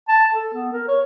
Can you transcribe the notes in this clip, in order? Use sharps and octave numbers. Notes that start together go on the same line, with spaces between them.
A5
A4
B3
A#4
C#5